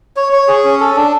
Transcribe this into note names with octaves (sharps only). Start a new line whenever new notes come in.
C#5
C#5
G#4
C#4
A4
D4